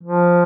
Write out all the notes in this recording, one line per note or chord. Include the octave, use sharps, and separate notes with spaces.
F3